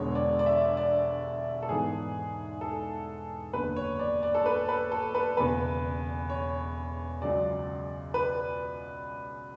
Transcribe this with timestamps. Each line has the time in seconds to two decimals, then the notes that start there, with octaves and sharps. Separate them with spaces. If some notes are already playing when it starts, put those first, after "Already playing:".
Already playing: E1 E2 D3 G#3 B3 C#5
0.15 D5
0.39 D5
0.46 E5
0.77 D5
1.63 A4
1.69 G#2 E3 B3 G#4
2.61 A4
3.53 F#1 E2 D3 B4
3.76 C#5
3.99 D5
4.23 D5
4.35 A4
4.46 B4
4.69 B4
4.92 A4
5.15 B4
5.37 E1 E2 C#3 B4
6.29 C#5
7.22 C#2 C#3 F#3 D5
8.14 B4